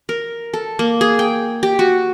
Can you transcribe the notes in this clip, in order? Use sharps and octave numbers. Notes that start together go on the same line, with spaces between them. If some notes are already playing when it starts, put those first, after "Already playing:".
A#4
A4
A#3
G#4
G5
G4
F#4